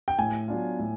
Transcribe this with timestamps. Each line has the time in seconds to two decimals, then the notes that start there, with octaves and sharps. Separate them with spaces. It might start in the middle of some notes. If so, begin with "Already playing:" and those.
0.08 G5
0.18 A2 G#5
0.48 F#3 B3 D4 F4
0.79 A2